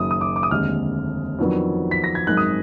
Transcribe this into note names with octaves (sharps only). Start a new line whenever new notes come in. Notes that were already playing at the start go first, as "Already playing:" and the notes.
Already playing: F#1 F#2 D#3 D#6
D#6
D6
D6
D#6
F1 D#2 D3 G#3 F6
F2 D#3 F#3 B3 D4
B6
A#6
G#6
G#1 F#2 D#3 G#3 F#6
D#6